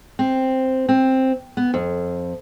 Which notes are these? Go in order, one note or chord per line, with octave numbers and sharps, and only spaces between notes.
C4
C4
B3
F2